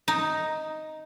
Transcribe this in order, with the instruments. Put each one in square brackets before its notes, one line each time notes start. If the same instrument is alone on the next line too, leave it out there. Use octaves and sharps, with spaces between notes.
[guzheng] D#4